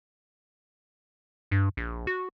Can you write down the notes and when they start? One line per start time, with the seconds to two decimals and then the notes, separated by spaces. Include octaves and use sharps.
1.51 G2
1.77 A#1
2.07 F#4